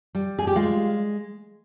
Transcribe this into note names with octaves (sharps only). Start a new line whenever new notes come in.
G3
G#4
G4
G#3 F4